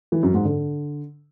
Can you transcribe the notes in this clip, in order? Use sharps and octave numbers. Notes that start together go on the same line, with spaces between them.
E3
F#2
G#2
D3